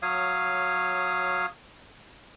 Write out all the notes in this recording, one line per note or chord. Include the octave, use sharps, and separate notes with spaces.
F#3 C#5 F5 D#6